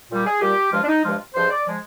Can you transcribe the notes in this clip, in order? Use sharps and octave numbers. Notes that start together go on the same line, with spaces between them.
A#2 G3
G#4
A#2 G3 G4
G2 F3 G#3 F4
D4
D#4
G2 F3 G#3 F4
G2 F3 G#3 C5
D5
F3 G#3